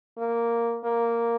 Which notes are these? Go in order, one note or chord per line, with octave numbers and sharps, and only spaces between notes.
A#3
A#3